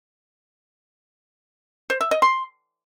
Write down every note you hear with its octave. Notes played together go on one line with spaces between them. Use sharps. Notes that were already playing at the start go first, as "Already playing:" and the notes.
C5
E5
D#5
C6